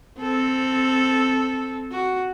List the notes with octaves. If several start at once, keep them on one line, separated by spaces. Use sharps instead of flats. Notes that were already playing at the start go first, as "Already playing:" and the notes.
C4 A4
F#4